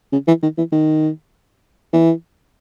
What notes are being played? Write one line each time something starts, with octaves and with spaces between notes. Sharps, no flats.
C#3
E3
D#3
E3
D#3
E3